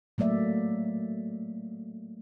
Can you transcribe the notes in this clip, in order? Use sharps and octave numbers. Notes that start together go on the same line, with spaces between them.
F#3 A3 A#3 D5 E5